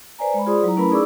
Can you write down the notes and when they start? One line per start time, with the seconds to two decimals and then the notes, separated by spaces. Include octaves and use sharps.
0.19 B4 C5 D5 G#5 A#5
0.34 G#3 B5
0.46 F4 G#4 C5 D5 C6 D#6
0.63 F#3 E4 A#5
0.77 A3 C#4 E4 A#4 B4 B5
0.91 D#4 G#4 D5 C#6 D6 E6